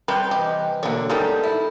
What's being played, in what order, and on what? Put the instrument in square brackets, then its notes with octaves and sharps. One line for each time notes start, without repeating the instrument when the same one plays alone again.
[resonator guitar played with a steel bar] C3 G3 G5 [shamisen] B4
[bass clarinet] E3 [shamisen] G4 [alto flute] D#5
[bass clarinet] B2 [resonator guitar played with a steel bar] D3 [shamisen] A3 C#5 [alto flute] A#3
[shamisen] D#3 G#3 B3 [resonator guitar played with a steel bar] G3 [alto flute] D#4 [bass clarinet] A4
[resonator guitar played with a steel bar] E4